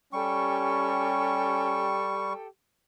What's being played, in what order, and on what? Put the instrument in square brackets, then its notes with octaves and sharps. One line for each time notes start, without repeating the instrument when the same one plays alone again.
[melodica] G3 C#6 [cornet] C#4 [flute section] G4 A4 G5